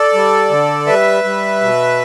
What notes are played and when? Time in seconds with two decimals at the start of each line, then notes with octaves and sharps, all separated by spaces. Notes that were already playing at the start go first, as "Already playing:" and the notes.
Already playing: A4 D5
0.14 G3
0.50 D3
0.87 G3 B4 E5
1.24 G3
1.61 B2